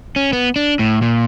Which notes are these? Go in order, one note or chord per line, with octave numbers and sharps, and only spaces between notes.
C#4
B3
D4
A2
A#2